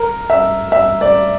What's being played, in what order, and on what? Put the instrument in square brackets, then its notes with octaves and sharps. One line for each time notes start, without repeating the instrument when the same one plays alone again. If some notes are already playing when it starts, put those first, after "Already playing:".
Already playing: [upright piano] A#4
E5
E5
D5